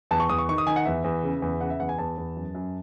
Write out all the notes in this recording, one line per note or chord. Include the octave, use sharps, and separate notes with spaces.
E2 A5
C#6
E2 D#6
C#6
D#3 C#6
D#6
D#3 G#5
F#5
E2 E5
E2
C#3
E2
C#3 F#5
E5
E2 F#5
G#5
E2 A5
E2
F#2
F#2